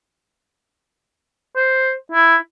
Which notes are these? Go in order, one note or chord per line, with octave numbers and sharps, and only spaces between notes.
C5
E4